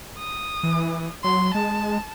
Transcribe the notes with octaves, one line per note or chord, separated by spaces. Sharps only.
D#6
E3
F#3 C6
G#3 A5